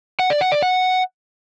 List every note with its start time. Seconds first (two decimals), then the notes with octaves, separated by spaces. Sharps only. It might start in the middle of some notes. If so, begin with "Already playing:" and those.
0.19 F#5
0.30 D5
0.41 F#5
0.52 D5
0.62 F#5